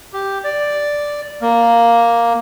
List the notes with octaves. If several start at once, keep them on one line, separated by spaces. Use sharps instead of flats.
G4
D5
A#3